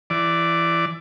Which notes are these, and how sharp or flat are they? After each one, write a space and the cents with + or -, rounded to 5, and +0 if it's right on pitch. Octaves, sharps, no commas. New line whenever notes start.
E3 +20 D5 +0